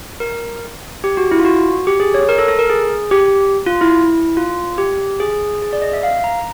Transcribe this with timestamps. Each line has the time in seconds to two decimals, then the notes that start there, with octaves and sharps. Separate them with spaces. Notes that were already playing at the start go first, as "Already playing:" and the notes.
0.20 A#4
1.04 G4
1.17 F#4
1.31 E4
1.40 F4
1.45 F#4
1.87 G4
2.00 G#4
2.14 C#5
2.29 A#4
2.38 A4
2.48 A4
2.59 A#4
2.70 G#4
3.11 G4
3.67 F4
3.81 E4
4.37 F4
4.78 G4
5.20 G#4
5.62 G#4
5.73 D5
5.82 D#5
5.93 E5
6.03 F5
6.24 A#5